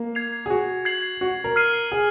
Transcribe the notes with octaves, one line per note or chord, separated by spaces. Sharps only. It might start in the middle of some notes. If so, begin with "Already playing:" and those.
Already playing: A#3
G#6 C7 F7
G#4
F#4
G#6 C7 F#7
F#4
A#4
F6 C7 D#7
G#4